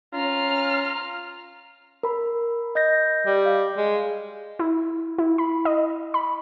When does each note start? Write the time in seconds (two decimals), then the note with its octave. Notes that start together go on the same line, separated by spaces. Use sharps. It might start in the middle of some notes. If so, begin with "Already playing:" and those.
0.14 C#4 F4 A#5 F6
2.03 A#4 B5
2.75 D#5 G6 A#6
3.26 G3
3.46 F5
3.77 G#3
4.59 E4
5.18 E4
5.38 B5
5.65 D#5
6.14 B5